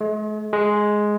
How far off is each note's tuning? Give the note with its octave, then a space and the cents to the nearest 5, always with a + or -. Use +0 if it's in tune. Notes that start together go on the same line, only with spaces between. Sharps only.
G#3 +45
G#3 +5